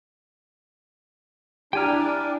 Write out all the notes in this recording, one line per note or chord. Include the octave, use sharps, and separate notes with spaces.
D4 E4 G4 D5 G5 G#5 A#5 F6